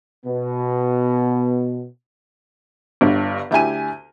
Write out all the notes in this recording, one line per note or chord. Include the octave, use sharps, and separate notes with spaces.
B2 B3
G1 G2
D2 E4 G4 G#5 D#7